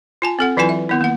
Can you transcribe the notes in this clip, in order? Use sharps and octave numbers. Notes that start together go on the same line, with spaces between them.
F4 G#5 A5
C4 A4 F#5
E3 F#3 E4 F4 B4 G#5
E5
D#3 B3 E4
A#3 F#5